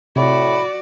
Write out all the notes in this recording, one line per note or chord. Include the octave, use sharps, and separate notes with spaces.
A2 C3 F#4 D5 B5